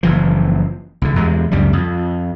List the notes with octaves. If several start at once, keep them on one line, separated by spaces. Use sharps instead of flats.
F#1 E3 F3
C2 D3
E2 C3 G#3
C#2 F#2 C3 G3
F2